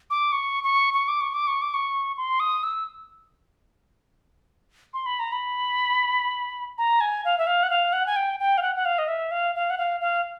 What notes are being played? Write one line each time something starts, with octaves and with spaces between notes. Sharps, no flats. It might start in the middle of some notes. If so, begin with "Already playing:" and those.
D6
C#6
C#6
C#6
D6
C#6
D6
C#6
D6
C#6
C6
D#6
E6
C6
B5
A#5
B5
A#5
G#5
F5
E5
F5
F#5
F5
F#5
G#5
G5
G5
F5
F#5
F#5
F5
D#5
E5
F5
F5
F#5
F5
F5